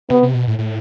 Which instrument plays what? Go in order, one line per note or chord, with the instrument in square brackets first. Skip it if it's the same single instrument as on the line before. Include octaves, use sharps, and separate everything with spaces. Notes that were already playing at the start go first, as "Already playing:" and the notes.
[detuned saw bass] C3 [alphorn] B3
[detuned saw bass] C3
B2
A2
A2